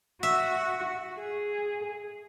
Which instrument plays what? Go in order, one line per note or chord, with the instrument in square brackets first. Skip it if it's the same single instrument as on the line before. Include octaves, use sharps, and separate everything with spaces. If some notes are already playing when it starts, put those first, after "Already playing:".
[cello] F#4 [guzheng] E5
[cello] G#4